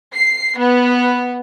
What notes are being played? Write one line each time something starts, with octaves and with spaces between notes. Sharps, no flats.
C7
B3